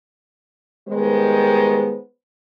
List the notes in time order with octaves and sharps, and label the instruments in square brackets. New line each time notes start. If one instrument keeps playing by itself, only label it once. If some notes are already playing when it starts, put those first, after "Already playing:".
[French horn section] D#3 G3 G#3 B3 C5